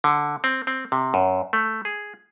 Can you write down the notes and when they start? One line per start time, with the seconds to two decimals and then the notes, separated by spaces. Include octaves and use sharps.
0.04 D3
0.44 C4
0.67 C4
0.92 C3
1.14 F#2
1.53 A3
1.85 G#4